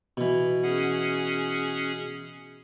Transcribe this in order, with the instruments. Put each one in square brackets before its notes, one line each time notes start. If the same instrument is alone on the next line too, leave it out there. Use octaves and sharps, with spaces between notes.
[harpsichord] B2 E3
[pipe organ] C#4 G#4 F#5